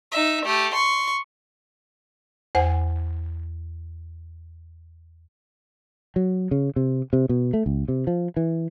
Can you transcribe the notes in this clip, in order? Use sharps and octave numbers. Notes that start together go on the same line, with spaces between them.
D#4 E5
A3 G4
C6 C#6
E2 C5 F#5 G#5
F#3
C#3
C3
C3
B2
A3
C#2
C3
F3
E3